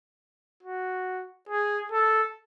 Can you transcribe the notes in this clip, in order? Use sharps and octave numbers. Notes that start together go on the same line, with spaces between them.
F#4
G#4
A4